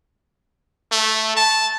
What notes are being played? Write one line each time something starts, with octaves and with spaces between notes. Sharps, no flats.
A3
A5